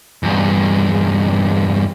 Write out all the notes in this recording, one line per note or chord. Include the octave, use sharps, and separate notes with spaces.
E2 G2